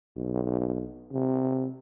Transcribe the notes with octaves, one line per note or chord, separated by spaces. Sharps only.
B1
C3